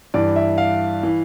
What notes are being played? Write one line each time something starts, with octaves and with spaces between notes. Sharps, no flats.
G2 E3 D5
E5
F5
E3